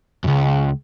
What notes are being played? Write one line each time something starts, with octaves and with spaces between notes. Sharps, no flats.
C#2 F#2